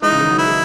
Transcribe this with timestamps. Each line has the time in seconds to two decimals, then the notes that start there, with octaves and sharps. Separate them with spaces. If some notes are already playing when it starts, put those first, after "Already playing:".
0.02 E3 G#3 D#4
0.11 C#3
0.21 D#3
0.30 F#3
0.38 E3 E4
0.48 D#3